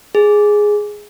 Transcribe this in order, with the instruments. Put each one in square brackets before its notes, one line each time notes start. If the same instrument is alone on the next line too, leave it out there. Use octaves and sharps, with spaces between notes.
[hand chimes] G#4